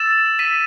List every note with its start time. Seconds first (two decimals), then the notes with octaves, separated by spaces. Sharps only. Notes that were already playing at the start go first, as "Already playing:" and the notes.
Already playing: E6 A6 E7
0.39 E6 B6 D#7